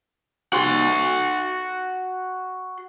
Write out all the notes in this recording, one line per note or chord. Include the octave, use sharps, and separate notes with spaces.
F#4 C6